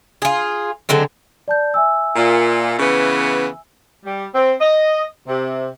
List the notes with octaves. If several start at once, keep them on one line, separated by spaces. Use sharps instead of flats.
F4 G#4
D3 F#3 G#3 C4
D5 A5 G6
E5 G#5 E6
A#2
C#3 E3 B3
G3
C4
D#5
C3